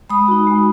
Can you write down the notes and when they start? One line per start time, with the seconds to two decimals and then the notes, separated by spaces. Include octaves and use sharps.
0.10 G#3 B5 D#6
0.28 D#4 F#4
0.47 G#3